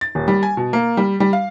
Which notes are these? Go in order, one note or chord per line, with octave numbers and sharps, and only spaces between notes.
A6
D#1
G3
G#5
B2
A#3
G3
G3
F5